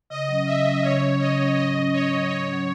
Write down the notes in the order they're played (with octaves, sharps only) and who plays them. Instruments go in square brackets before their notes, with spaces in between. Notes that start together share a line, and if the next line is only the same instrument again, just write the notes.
[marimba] C#3 [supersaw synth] D#5
[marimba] F#3 C#4
[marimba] C#3 [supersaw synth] E5
[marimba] F#3 C#4
[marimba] C#3 [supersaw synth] C#5
[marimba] F#3 C#4
[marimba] C#3 [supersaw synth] D#5
[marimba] F#3 C#4
[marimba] G#2 [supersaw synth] D#5
[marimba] F#3 C#4
[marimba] G#2 [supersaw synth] C#5
[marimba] F#3 C#4
[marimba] G#2 [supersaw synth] C#5
[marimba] F#3 C#4